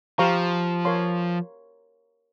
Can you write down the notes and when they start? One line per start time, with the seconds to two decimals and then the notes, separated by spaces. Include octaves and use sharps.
0.18 F3 G4 C5 F5 A#5 C#6
0.85 A#4 C#5 F5 C6